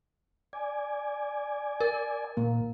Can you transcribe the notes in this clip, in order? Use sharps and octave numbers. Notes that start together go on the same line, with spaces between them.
D5 G#5
A#4
A#2 A#3